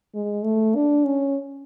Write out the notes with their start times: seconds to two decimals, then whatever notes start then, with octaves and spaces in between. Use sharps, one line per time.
0.15 G#3
0.44 A3
0.75 D4
1.05 C#4